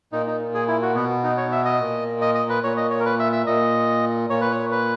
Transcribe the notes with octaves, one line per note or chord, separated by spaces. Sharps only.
A#2 D#4
D#4
G#4
E4
F#4
B2 B3
D#4
C#5
E5
D#5
A#2
D#5
D#5
B4
A#2 C#5
D#5
C#5
A#4
B4
E5
E5
A#2 D#5
A#2 C#5
B4
C#5
B4